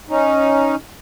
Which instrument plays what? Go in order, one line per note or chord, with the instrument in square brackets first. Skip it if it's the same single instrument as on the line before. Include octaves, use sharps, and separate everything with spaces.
[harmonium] C#4 D#4